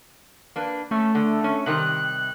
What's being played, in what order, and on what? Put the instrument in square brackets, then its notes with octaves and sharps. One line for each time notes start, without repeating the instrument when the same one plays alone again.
[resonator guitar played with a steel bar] A#3 D4 B4
[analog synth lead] A3 [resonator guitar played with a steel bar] C#4
[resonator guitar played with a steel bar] D3
C#4
[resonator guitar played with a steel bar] C3 D#3 G3 [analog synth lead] F#6